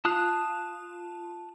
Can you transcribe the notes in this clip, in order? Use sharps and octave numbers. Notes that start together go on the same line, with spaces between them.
F4 A5 D#6 F#6